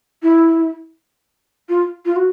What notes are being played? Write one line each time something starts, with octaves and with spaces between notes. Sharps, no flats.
E4
F4
F4
F#4